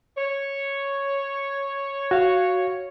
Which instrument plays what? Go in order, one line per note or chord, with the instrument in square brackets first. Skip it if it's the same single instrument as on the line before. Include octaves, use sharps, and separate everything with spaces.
[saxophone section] C#5
[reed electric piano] F#4 F5